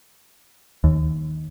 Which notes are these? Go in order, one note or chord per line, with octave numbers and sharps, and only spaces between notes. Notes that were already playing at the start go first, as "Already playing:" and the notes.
D#2